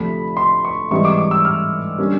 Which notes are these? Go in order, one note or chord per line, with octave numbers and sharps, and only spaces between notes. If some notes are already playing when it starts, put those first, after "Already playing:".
Already playing: D2 C3 F3 A3 B5
C6
C#6
G#2 E3 G3 C4 D#4 C#6
D6
D6
E6
F6
D3 G3 A#3 C#4